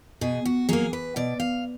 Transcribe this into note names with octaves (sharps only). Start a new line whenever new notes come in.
B2 G#4
F#4
F#3 A#3 G#4
B4
B2 D5
F5